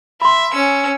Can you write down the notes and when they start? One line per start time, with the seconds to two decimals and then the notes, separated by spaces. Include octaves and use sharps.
0.22 E5 B5 C6
0.54 C#4 E6